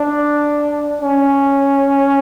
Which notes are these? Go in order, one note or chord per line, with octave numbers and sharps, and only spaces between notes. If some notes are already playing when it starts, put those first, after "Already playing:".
Already playing: D4
C#4